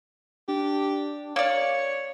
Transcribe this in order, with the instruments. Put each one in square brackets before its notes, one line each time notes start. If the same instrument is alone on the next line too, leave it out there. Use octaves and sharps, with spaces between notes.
[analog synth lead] D4 [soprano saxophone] G4
[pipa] A#3 D5 [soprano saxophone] C#5 [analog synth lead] C#7